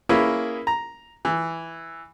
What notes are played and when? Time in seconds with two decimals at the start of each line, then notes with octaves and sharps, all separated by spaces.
0.09 A#3 C#4 E4 G#4 B4
0.67 A#5
1.25 E3